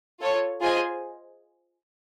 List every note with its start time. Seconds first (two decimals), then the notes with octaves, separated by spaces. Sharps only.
0.21 F4 A4 C#5
0.62 F4 G#4 C5 D#5 G#5